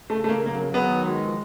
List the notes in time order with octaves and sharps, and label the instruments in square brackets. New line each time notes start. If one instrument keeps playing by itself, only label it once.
[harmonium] C#3 [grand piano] A3
[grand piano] A3
[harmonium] C#3 [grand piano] A#3
[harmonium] F#3 [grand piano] A#3
[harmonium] F#3
[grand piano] B3
[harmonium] D#3
G#3
F3